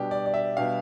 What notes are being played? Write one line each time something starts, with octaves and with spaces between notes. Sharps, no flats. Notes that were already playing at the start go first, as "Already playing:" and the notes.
Already playing: B2 G3 D4 G4
D5
D5
E5
B2 G3 D4 F5